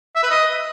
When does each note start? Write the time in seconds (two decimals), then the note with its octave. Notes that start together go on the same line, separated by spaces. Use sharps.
0.16 E5
0.23 B4
0.30 D#5